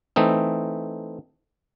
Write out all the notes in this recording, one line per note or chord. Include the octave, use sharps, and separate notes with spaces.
E3 A3 C4 D#4